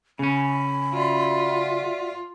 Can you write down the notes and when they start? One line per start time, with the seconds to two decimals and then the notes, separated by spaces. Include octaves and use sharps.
0.19 C#3 C#4 B5
0.94 F4 F#4 D5 E5